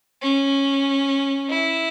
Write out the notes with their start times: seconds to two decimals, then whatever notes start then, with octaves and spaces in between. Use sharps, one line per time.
0.22 C#4
1.49 E4